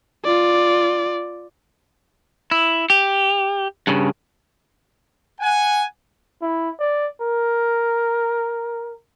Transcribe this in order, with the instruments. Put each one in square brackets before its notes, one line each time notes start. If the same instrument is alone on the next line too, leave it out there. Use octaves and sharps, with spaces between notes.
[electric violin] F4 D5
[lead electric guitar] E4
G4
G2 C#3
[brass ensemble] F#5 G#5
[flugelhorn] E4
D5
A#4